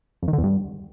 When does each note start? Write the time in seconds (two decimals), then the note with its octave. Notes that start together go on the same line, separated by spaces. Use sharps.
0.22 F2
0.28 D#3
0.33 D3
0.38 E2
0.44 G2